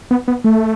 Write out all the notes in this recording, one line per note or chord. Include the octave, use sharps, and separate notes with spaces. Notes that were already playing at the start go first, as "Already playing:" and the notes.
B3
B3
A3